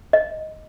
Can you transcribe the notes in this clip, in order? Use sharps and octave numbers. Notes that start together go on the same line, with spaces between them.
D#5